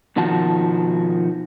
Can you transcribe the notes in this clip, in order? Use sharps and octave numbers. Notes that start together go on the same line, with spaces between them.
B2 D#3 F3 F#4 A5